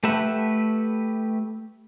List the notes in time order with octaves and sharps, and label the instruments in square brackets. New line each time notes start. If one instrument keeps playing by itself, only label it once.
[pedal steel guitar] A3 G4 B4 E5 F#5